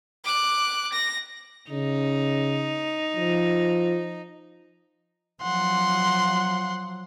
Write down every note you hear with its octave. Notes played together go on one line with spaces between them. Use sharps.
D6 F#6
A#6
C#3 D#4
F3
F3 F#3 F#5 C6